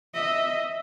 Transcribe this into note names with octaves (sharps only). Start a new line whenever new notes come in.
D#5 E5